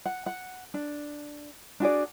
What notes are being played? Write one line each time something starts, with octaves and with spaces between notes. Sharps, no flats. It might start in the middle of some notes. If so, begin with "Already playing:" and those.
F#5
F#5
D4
D4 F#4 G#4 D5